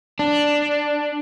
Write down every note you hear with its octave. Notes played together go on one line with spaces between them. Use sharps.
D4